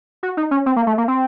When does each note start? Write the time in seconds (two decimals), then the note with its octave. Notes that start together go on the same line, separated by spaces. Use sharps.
0.23 F#4
0.37 D#4
0.51 C#4
0.66 C4
0.76 A#3
0.87 A3
0.98 A#3
1.08 C4